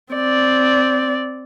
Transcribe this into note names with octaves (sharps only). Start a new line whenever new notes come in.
C4 D5